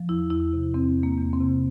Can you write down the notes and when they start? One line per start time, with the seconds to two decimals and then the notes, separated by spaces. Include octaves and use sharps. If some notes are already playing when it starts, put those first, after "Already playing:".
Already playing: F3
0.09 E2 E4
0.30 E2 E4
0.53 C3
0.74 E2 C4
0.97 E2
1.03 A#3
1.18 E2
1.33 C4
1.40 C3